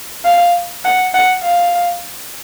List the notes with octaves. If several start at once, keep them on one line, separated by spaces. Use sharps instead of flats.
F5
F#5
F#5
F5